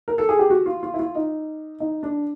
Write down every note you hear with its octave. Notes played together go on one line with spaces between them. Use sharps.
A#4
A4
G#4
G4
F#4
F4
F4
E4
F4
D#4
D#4
D4